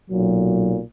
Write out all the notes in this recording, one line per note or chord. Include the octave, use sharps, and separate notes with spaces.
B1 A#2 F#3